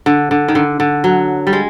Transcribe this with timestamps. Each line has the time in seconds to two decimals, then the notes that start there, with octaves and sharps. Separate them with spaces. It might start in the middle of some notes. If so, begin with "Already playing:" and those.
0.06 D3
0.31 D3
0.48 D#3
0.55 D3
0.80 D3
1.04 F#3
1.47 G3
1.53 G#3